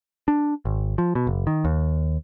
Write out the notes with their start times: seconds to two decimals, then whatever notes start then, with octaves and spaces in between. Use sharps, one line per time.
0.28 D4
0.65 G#1
0.98 F3
1.15 B2
1.27 F#1
1.47 D#3
1.65 D#2